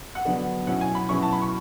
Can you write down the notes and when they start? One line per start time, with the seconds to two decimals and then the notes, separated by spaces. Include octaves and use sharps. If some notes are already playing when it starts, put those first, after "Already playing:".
0.15 F#5
0.25 D3 F#3 B3 D4
0.67 B2 F#3 C#4 E4 F#5
0.81 G#5
0.95 B5
1.09 B2 F#3 C#4 E4 C#6
1.22 A5
1.33 B5
1.42 C#6